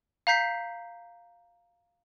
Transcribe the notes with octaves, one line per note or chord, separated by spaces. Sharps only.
F5 A#5 G6 B6 C7